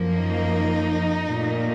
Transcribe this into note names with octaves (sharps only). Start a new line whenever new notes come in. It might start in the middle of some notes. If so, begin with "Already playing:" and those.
Already playing: F#2 F3 A#3
D#4
A#2 A3